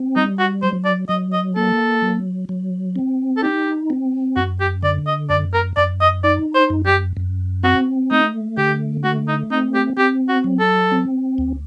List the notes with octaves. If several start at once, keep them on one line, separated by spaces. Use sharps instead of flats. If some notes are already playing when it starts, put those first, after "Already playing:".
Already playing: C4
G3 D#4
F#4
F#3 C5
D5
F#3 D#5
D#5
A#3 A4
F#3
F#3
C4
A4
D#4 G4
C4
F#2 F#4
G4
D3 D5
D#5
F#2 D5
A#4
F#2 D5
D#5
D#4 D5
C5
F#2
G4
F#2
C4 F#4
A3 D#4
D3 G4
A3 F#4
D#4
C4 D#4
G4
C4 G4
F#4
F#3
A4
C4
D2